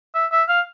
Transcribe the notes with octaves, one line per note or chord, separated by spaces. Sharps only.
E5
E5
F5